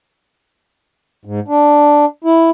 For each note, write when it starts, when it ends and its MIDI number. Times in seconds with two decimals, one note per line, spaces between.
1.25 1.40 44
1.48 2.05 62
2.24 2.50 64